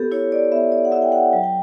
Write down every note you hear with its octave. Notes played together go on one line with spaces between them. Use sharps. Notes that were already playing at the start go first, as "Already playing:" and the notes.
Already playing: B3 G4 A4
E4 C#5
D5
B3 E5
D5
F#5
E4 E5
G5
F#5
F#3 G5
G5